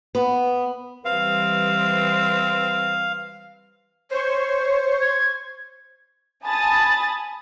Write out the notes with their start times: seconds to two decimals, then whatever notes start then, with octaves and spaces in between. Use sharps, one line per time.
0.15 B3
1.05 E3 G3 C4 B4 F5
4.11 C5 C#5 C#6
5.01 G#6
6.44 G#5 A5 B5 D#6 A6